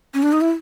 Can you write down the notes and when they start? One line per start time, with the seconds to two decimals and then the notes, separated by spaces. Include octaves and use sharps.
0.14 C#4
0.23 D4
0.33 D#4
0.41 E4